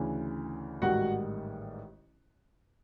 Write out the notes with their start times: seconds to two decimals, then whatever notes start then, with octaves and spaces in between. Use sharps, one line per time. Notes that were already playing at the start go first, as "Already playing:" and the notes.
Already playing: D2 C#3 E3
0.82 A1 G#2 D#3 G3 F#4 F#5